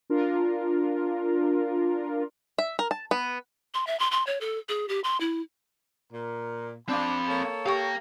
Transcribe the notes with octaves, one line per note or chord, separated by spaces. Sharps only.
D4 F4 A#4
E5
A#4
A5
B3
C6
E5
C6
C6
C#5
A4
G#4
G4
C6
E4
A#2 A#4
C4 D4 F5 B5
A#3 A4 C#5
G4 A#4 F5 G5 C#6